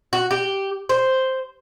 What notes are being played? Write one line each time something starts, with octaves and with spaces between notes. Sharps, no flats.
F#4
G4
C5